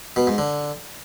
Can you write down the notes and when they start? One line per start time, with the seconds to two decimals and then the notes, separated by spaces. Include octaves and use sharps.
0.16 B2
0.27 G#2
0.38 D3